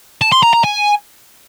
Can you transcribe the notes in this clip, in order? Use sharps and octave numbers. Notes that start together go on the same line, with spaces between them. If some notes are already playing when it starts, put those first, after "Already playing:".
A5
C6
A#5
A#5
G#5